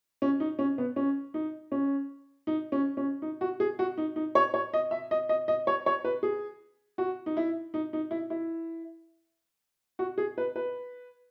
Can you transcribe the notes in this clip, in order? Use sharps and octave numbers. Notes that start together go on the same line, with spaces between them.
C#4
D#4
C#4
B3
C#4
D#4
C#4
D#4
C#4
C#4
D#4
F#4
G#4
F#4
D#4
D#4
C#5
C#5
D#5
E5
D#5
D#5
D#5
C#5
C#5
B4
G#4
F#4
D#4
E4
D#4
D#4
E4
E4
F#4
G#4
B4
B4